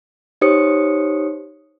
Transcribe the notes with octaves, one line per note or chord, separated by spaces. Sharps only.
D#4 G4 C5 C#5 D#6 C#7